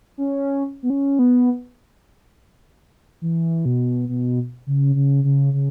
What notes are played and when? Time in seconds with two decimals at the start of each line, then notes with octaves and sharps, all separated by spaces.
0.18 C#4
0.83 B3
0.90 C#4
1.19 B3
3.22 E3
3.65 B2
4.09 B2
4.67 C#3
4.95 C#3
5.24 C#3
5.53 C#3